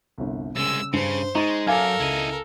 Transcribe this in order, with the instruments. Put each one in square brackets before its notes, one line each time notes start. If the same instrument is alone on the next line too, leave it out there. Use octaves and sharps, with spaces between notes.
[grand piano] G1 C2
[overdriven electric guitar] C2 G#3 [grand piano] C#3 [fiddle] E6
[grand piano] G2 [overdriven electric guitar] C#3 [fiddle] C5
[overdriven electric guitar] G#3 [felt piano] D#4 [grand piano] C#6 A6
[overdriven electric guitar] F#2 [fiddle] A4 A#4 [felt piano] F5 G#5 [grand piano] D6
[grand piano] C#2 [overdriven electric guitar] E4 D#5